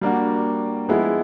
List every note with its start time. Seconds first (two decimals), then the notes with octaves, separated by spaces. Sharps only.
0.01 G3 A#3 D4 F#4
0.89 F3 G#3 B3 E4